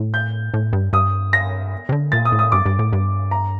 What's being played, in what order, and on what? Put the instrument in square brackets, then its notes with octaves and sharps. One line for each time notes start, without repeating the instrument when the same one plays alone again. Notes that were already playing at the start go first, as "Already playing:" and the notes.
Already playing: [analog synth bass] A2
[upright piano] G6
[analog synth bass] A2
G2
[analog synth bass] G2 [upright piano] D#6
[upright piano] A#6
[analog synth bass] C3
D3
[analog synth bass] A#2 [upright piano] A6
[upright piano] D#6
[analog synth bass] A2
[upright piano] D#6
[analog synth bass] G2 [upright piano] D6
[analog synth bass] G2
A2
G2
[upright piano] A#5